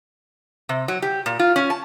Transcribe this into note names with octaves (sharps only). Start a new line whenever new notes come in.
C3
F#3
G4
A#2
F4
C#4
A5